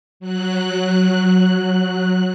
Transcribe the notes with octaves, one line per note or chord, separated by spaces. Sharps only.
F#3 F#6